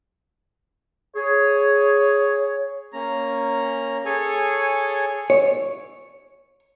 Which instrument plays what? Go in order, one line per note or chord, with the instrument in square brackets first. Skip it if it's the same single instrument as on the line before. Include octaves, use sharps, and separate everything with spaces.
[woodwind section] G#4 C#5
[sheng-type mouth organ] A#3 C#4 A#5
G#4 A4 C#5 G#5
[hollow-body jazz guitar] C#5